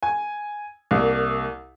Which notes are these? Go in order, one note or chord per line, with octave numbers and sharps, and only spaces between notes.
G#5
C2 A#3